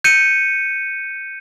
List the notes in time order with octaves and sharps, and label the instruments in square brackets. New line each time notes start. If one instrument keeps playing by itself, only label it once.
[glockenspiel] G6 C#7 D#7